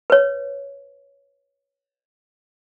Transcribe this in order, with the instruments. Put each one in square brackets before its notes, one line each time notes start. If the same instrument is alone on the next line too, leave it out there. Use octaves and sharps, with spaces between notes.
[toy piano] B4 C#5